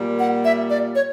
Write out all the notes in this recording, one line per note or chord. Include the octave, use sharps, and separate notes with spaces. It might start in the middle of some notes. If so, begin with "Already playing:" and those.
Already playing: A#2 G3 A#3
F#5
E5
D5
C#5